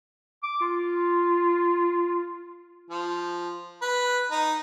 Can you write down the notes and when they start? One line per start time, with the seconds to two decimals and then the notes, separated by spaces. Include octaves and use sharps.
0.43 D6
0.61 F4
2.90 F3
3.82 B4
4.31 D#4